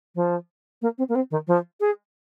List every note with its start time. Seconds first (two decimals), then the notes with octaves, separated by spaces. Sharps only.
0.15 F3
0.82 A#3
0.98 C4
1.09 A#3
1.15 C4
1.31 D#3
1.47 F3
1.80 G#4